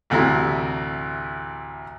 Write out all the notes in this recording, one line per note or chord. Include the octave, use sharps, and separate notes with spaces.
A1 D2 C3 E4